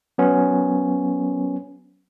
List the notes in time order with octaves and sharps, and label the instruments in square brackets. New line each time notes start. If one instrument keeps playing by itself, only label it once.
[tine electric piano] F#3 B3 C#4